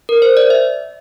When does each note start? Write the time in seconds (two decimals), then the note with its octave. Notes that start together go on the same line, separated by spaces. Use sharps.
0.09 A#4
0.22 C5
0.37 D5
0.50 E5